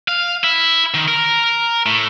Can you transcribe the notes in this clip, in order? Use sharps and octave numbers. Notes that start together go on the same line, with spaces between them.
F5
E4
D#3
A#4
A2